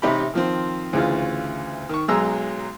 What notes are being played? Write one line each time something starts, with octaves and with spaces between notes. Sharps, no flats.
A1 C3 D#4 G4 G5 B5
D#3 F3 C4
D2 C#3 E3 F4
D#3 C#6
B1 F#3 G#3 G#4 A#5 E6